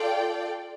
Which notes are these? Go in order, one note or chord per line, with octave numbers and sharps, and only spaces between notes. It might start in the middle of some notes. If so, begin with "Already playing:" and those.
Already playing: F4 A4 D5 G5